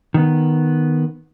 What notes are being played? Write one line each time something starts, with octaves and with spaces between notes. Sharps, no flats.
D#3 B3